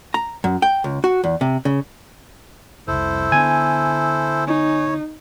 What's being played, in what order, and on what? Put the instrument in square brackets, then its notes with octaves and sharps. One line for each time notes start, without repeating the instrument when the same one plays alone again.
[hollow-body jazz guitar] A#5
F#2
G5
C#2
F#4
E2
C3
C#3
[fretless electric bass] F1 C2 [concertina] E4 A4 C5
[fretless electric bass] D3 B3 D4 [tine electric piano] G#5
[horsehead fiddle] D#4 [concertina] C#5